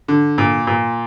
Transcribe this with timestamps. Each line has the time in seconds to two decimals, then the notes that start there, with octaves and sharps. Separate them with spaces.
0.08 D3
0.38 A#2
0.67 A#2